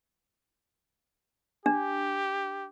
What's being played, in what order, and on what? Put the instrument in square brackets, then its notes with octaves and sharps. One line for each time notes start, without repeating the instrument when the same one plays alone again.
[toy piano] D4 [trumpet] G4